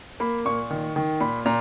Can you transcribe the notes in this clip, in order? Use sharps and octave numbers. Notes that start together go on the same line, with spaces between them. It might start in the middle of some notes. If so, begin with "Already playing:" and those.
A#3 B5
A#2 C#6
D#3
D#3
A#2 B5
A#2 A#5